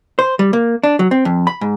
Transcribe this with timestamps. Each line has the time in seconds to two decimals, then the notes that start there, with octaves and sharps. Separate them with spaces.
0.19 C5
0.39 G3
0.53 A#3
0.84 D4
0.99 F#3
1.11 C4
1.25 F2
1.47 B5
1.61 G#2